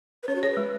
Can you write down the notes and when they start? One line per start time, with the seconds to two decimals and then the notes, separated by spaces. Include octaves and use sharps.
0.23 B4
0.28 C#4 C#5
0.36 F#4
0.42 G#4 C#5
0.50 B4
0.57 G#3